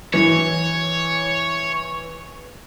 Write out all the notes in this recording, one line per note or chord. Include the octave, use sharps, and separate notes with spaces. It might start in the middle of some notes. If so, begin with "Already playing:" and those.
E3 C#5